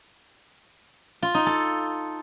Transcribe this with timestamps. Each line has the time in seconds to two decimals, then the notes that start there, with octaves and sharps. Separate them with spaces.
1.22 F4
1.34 D#4
1.46 A4